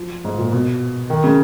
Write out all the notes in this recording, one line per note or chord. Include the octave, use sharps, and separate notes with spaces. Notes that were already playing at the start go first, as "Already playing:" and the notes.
Already playing: F3
G#2
A#2
B2
D#3
C#3